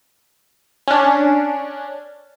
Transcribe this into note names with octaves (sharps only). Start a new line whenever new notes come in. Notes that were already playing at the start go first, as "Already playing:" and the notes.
C#4 D4